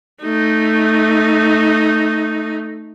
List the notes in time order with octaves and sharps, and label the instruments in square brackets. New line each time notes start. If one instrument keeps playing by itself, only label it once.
[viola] A3 D#4